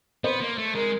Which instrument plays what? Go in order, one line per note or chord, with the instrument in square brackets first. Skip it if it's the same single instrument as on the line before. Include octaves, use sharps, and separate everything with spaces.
[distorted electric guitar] B3 [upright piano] C5
[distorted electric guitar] A#3
A3
[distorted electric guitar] G#3 [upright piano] A#4